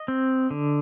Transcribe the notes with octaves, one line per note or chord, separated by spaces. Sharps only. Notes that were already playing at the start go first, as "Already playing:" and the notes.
Already playing: D#5
C4
D3